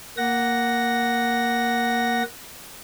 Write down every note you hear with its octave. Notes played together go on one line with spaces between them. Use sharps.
A#3 F#5 A#6